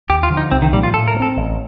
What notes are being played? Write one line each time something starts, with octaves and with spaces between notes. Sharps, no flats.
D#2 G4
F4
D3 F3
D#4
C2 C4
D#3
A#2 F3 G3 A#3
F4
A2 A4
A#4
A3
C4 A4
A1